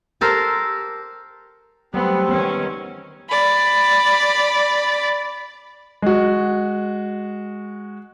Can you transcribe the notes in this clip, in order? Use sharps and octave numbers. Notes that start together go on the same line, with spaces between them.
G4 A4 A#4 C5
F#3 G3 A3 B3 C4
D#3 B3 C#4
D5 B5
G#3 F#4